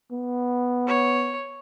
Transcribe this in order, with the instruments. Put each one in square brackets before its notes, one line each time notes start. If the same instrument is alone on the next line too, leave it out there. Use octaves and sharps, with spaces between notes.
[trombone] B3
[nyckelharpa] C#5